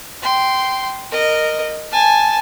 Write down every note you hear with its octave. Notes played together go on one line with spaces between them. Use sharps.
G5 C6
A#4 D#5
G#5 A5